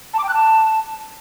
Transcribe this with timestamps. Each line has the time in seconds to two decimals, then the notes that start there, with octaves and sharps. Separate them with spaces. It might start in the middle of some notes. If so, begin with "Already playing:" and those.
0.14 A5
0.19 D6
0.24 G5
0.29 F#6
0.34 A5